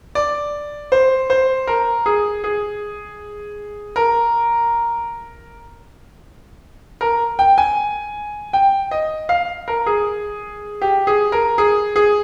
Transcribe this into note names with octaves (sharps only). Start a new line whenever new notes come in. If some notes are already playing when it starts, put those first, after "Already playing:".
D5
C5
C5
A#4
G#4
G#4
A#4
A#4
G5
G#5
G5
D#5
F5
A#4
G#4
G4
G#4
A#4
G#4
G#4